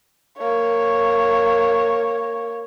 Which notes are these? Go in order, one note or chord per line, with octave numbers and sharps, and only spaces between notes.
A#3 C#5